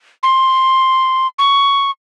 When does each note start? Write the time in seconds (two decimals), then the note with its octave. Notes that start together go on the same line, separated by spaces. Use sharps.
0.23 C6
1.39 C#6